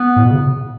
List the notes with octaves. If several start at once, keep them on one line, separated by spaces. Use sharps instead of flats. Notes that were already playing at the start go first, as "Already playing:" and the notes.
Already playing: B3
A2
B2
C#3